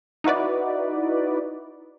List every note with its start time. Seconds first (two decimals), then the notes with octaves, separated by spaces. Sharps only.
0.24 D#4 E4 F#4 B4 D5